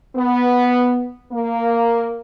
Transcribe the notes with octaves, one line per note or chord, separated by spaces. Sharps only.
B3
A#3